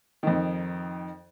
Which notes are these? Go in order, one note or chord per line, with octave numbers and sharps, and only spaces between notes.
F2 D#3